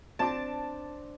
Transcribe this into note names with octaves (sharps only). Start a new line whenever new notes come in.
C4 D4 A5 D6